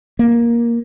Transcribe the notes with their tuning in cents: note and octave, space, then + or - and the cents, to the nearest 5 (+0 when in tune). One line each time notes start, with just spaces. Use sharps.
A#3 +10